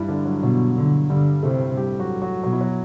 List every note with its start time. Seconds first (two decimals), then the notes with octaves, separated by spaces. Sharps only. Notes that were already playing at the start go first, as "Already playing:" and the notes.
Already playing: G2 E3 G3 E4
0.09 D3 D4
0.25 F#3
0.42 B2 F#3
0.77 D3
1.10 G2 D3 G3
1.43 A2 C3 A3
1.76 G3 G4
1.99 F#3 F#4
2.22 F#3 F#4
2.43 B2 F#3 F#4
2.53 E4
2.61 F#3 F#4